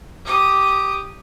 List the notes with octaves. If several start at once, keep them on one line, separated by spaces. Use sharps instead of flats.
G4 D#6